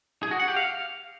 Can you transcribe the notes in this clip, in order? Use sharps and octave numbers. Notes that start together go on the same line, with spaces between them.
G#4
F#4
F#5
G4
F5